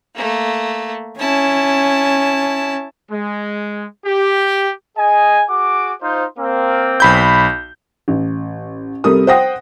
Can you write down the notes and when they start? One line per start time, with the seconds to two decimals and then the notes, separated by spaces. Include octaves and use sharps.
0.15 A3 A#3
1.19 C#4 E4 A5
3.10 G#3
4.06 G4
4.97 G#4 D#5 G#5
5.50 F#4 G#4 D6
6.02 D#4 F4 C5
6.39 A#3 C4
7.00 B1 B5 G6
8.08 A1
9.04 C3 G3 A4 A#4 D#6
9.27 C5 F#5 G5 D#6 A#6